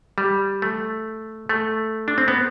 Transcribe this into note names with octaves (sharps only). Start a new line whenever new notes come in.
G3
A3
A3
D4
C4
B3